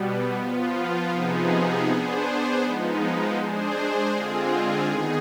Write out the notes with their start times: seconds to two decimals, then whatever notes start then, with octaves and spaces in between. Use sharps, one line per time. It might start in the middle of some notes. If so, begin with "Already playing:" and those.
Already playing: B2 G3 B3
0.37 F3 B3 F4
1.12 C3 F3 B3 D#4 G#4
1.87 B3 D4 G#4 C5
2.63 F3 G#3 B3 D#4
3.37 G#3 D4 G#4 C5
4.12 D3 G#3 C4 F4 G#4
4.87 D#3 B3 D#4 G#4